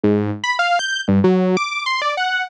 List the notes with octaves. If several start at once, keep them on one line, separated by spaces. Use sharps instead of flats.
G#2
B5
F5
G6
G2
F#3
D6
C6
D5
F#5